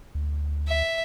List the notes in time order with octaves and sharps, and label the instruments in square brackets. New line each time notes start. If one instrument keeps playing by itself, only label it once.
[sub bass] D2
[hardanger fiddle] E5